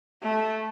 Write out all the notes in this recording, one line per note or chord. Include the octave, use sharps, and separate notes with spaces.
A3